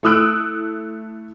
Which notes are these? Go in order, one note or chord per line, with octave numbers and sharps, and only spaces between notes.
A3 E4 D#6 E6 F#6 D7